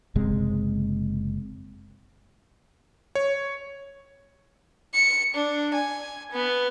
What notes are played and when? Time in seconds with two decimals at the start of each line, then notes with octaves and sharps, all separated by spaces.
0.16 F#1 C3 G#3
3.15 C#5
4.94 C#7
5.34 D4
5.74 G#5
6.32 B3